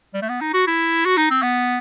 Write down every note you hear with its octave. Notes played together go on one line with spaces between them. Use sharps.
G3
A3
B3
D#4
F#4
E4
F#4
D#4
C4
B3